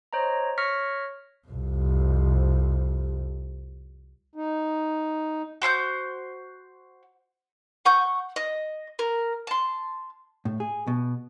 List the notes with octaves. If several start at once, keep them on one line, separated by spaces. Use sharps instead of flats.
C5 C#5 D#5 A#5
C#5 C#6 F6 A#6 B6 C#7
C2 F2
D#4
F#4 C5 E6 G6
F#5 C#6 G6
D#5
A#4
A5 C6
A2
G#4
B2